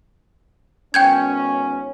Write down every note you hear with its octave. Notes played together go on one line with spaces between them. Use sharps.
G#1 B3 C#4 G5 G6 G#6